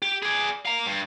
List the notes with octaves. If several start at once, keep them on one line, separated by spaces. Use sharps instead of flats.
G4
G#4 D5
F5 A#5
G2